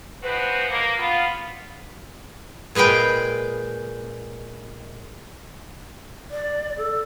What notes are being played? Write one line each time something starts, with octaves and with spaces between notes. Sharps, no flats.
F3 G#3 C4 F#4 B4 C5
A#3
B3 F4
A#2 G#3 B4 F5 G5
D5
A4